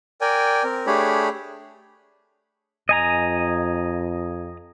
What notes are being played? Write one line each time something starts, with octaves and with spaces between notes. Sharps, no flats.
A#4 D5 G5 G#5
C4 A#4
A3 D4 G4 G#4 C#5 B5
F2 D#5 G#5 A#5